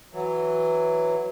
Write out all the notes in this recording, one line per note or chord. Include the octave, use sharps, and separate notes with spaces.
E3 F#3